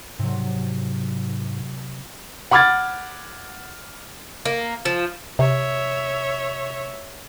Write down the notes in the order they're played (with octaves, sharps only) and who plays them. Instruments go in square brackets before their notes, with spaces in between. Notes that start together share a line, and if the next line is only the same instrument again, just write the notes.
[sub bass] G#2 [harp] C3 F#3
[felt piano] F#5 B5 D6 F6 G#6 A6
[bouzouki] A#3
F3
[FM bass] C3 [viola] C#5 E5